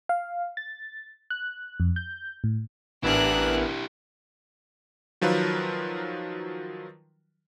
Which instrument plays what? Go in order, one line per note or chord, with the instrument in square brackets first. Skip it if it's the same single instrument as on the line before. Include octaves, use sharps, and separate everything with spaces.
[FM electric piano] F5
A6
F#6
F2
G6
A2
[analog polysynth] A1 B3 A#4 [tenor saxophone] E3 [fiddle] D4 F#6 [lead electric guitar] E4 G4
[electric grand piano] D#3 F3 F#3 F4 A#4 B4